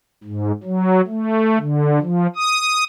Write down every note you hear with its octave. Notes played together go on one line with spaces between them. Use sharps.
G#2
F#3
A3
D3
F3
D#6